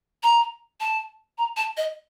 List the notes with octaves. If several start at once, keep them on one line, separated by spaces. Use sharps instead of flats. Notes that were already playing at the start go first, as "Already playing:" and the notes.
A#5
A5
A#5
A5
D#5